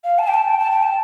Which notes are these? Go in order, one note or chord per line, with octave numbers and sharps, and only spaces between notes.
F5
A5
G5
A5
G5
A5
G5
A5